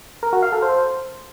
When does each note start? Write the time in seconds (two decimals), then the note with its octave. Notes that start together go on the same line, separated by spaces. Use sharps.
0.23 A#4
0.33 F#4
0.43 F5
0.52 A4
0.62 C5